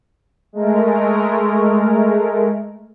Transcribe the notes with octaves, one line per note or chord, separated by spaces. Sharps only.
G#3 A3 A#4